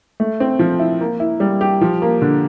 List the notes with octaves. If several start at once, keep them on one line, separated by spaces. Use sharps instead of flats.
A3
C4
F3
E4
A#3
E4
G3
G4
F3
A#3
D3